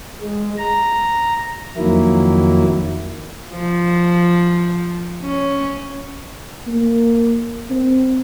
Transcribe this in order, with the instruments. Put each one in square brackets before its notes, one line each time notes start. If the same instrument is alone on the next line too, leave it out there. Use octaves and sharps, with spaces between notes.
[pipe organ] G#3
A#5
F2 D#3 F#3 A#3 E4
[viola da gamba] F3
C#4
[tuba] A#3
C4